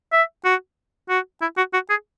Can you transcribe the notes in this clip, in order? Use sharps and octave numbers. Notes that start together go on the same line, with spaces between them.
E5
F#4
F#4
E4
F#4
F#4
G#4